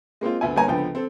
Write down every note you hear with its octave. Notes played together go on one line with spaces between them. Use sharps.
G#3 A#3 C4 F4
D2 B3 E5 G#5
G1 A#3 C#5 G#5 A#5
C#2 D3 F3 B3 G5
C4 A4